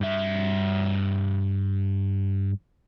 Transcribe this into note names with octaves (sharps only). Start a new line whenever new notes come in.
G2 E5